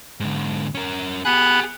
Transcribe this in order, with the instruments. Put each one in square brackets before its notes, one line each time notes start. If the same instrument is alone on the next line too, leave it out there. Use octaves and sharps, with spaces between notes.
[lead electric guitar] G#2 D3
C#4 A#4
[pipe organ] B3 B5 F#6 [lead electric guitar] G4 G#4